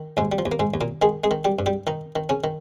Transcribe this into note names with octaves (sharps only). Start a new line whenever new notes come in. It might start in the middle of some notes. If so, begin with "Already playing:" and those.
Already playing: D#3
D#2 G#2 G#3
G3
F3
D#2
A#3
G#2 G#3
D#2
A#2 A#3
D#3 G#3 G#4
G#3 G#4
D#3
G3 G4
G2
G3 G4
D#3 D#4
D#3
C#3 C#4
D#3